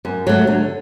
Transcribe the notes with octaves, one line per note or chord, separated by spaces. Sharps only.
F#2
F#3 A3
D3